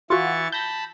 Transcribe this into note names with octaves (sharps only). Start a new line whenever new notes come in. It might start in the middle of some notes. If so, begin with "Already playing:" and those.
E3 F4 F#4 C#6 A6
A5 B5 G6 A#6